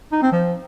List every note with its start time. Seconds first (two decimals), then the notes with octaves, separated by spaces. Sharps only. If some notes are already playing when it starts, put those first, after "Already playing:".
0.12 D#4
0.22 C4
0.32 F3